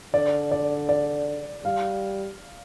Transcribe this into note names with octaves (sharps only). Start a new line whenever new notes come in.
D3 D5
D5
D5
G3 F5